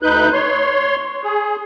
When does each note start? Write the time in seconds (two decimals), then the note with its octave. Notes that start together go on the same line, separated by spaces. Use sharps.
0.02 D2 D#4 B4 F#6 G6
0.33 C#5 C6
1.24 G#4